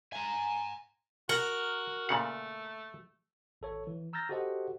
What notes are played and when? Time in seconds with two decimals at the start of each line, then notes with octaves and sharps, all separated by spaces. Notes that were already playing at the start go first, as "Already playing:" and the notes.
0.13 G#5 A#5
1.29 F#4 A#4 F#5
2.09 A#2 C#3 A3 F#5
3.61 G#1 A4 C#5
3.87 E3
4.13 A#5 E6 F6 G6 A6 A#6
4.29 F#4 G4 A4 C5 D#5 F#5